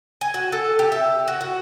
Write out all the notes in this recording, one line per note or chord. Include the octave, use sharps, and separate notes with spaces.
G#5
F#4
A4
G4
E5
F#4
F#4